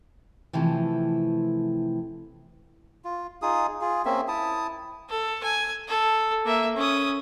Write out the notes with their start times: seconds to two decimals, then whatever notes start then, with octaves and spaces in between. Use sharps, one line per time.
0.53 C3 E3 F3 A3
3.04 F4
3.42 D#4 F4 G#4 D#6
3.81 F4 G#4
4.05 A#3 C4 C#4 E5
4.28 E4 A5 D#6
5.09 A4
5.43 G#5
5.88 A4
6.45 A#3 E5
6.76 C#4 D#6